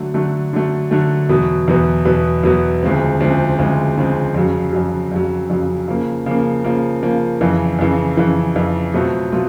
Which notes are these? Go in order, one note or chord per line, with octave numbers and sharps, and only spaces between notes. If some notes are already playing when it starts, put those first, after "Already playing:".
Already playing: D3 F#3 A3
D3 F#3 A3
D3 F#3 A3
D3 F#3 A3
E2 B2 F#3 B3
E2 B2 F#3 B3
E2 B2 F#3 B3
E2 B2 F#3 B3
D2 C#3 F3 G#3 C4
D2 C#3 F3 G#3 C4
D2 C#3 F3 G#3 C4
D2 C#3 F3 G#3 C4
F2 C#3 F#3
F2 C#3 F#3
F2 C#3 F#3
F2 C#3 F#3
C#3 F3 A#3
C#3 F3 A#3
C#3 F3 A#3
C#3 F3 A#3
F2 C#3 E3
F2 C#3 E3
F2 C#3 E3
F2 C#3 E3
B2 F#3 A3 C4 F4
B2 F#3 A3 C4 F4